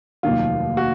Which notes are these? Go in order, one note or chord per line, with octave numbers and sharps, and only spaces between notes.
F1 D#2 D#3 F#3 F4
F#4